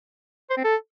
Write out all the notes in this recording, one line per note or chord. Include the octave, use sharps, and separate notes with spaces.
C5
C4
A4